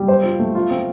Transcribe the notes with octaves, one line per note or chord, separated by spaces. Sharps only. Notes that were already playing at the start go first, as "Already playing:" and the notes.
Already playing: G3
C5
F4
A3
F4
C4